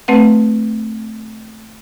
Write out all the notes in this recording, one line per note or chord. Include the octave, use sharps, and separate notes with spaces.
A3 C4 B4 F#5